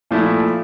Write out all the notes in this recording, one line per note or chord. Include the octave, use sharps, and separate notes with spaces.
A#2 F3 A3 E4